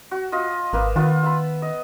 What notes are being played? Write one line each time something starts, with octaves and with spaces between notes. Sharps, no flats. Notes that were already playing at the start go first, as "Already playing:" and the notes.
F#4
F4 D#5
G#1 A#3 B4 E5
D#3 B3 F4
E5 B5
D#5